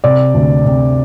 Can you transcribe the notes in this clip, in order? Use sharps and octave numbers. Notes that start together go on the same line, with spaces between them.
C3 D5
D2
C3